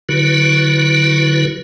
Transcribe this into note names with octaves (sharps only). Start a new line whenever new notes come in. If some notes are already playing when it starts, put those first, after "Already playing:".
D3 F#3 E4 F#4 B4